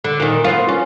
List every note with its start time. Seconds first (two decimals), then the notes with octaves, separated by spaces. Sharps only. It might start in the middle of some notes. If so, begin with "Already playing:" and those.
0.04 D3
0.20 A#2 D#3
0.44 B3 C4 F4
0.69 C#4